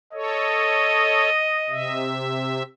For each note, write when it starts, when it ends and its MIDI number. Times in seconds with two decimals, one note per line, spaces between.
0.13 1.29 69
0.13 1.29 73
0.13 2.09 75
1.69 2.63 48
1.69 2.63 76